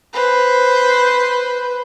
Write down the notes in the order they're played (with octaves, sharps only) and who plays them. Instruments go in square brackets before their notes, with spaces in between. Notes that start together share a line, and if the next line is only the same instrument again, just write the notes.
[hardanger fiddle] B4 C5